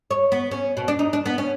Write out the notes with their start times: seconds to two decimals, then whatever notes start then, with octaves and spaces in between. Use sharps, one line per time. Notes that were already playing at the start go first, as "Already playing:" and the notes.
0.11 C#5
0.32 B3
0.51 C#4
0.77 B2
0.88 D4
0.99 D#4
1.13 D4
1.26 B3
1.38 C#4